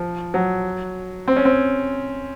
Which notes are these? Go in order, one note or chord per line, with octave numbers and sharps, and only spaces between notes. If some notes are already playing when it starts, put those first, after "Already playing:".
Already playing: F3
F#3
C4
C#4
C4